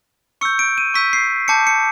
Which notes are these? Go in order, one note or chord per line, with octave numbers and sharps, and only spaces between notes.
C#6 E6 G6 C#7
D7
D#7
C#6 E6 G6 B6
C7
A5 D6 G6 C#7
C#7